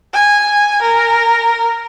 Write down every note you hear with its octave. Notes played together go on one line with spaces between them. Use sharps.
G#5
A#4